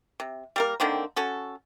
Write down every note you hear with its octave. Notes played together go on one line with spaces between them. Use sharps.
C3
G3 A#3 A#4
D3 D#3 A#3 C4
C#4 F#4 A4